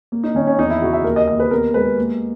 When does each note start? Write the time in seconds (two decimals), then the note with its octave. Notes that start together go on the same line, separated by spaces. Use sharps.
0.12 A#3
0.24 D#4
0.35 D#3 C#4
0.47 C#4
0.58 E2 D#4
0.70 E4
0.82 C#3 F#4
0.93 E5
1.04 D#2 A#4
1.16 D#5
1.28 D#2 D#5
1.40 B4
1.51 B3 A#4
1.74 G#3 B4
1.98 A#3